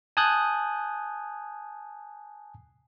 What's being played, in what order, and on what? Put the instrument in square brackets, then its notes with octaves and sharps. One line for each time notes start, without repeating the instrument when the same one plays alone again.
[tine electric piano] G#5 A5 D#6 F#6 G6